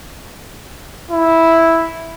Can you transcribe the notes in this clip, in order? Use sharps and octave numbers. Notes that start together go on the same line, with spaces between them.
E4